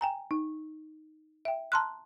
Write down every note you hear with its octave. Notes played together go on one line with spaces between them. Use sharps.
G5 G#5 A#5
D#4
E5 G5
A5 A#5 C6 F6 F#6